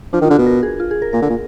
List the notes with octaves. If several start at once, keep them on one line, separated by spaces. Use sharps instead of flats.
F3 D4
D#3
F4
D3
B2 F#4
A#4
G#4
F4
G#4
A#4
A#2 A#4
D3
A#2